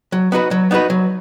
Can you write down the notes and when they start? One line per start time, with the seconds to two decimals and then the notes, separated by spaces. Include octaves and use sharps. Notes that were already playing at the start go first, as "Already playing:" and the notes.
0.12 F#3
0.32 B3 D#4 F#4 B4
0.51 F#3
0.71 B3 D#4 F#4 B4
0.90 F#3